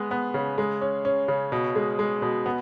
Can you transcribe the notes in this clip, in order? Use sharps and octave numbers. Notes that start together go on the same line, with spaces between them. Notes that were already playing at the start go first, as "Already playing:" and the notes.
Already playing: G#3 B3
B3
C#3
G#3
C#4
C#4
C#3
B2
G#3
G#3
B2
B3